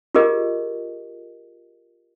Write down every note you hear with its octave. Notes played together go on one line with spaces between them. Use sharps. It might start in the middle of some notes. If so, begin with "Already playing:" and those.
F4 G4 G#4 A#4 D#5